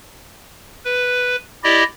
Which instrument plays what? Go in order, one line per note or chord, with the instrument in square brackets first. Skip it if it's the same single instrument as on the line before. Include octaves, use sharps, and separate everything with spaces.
[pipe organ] B4
E4 G4 D5 D#5